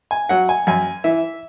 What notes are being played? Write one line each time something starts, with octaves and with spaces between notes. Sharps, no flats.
G#5
F#3 F#5
G#5
F#2 G#5
E3 E5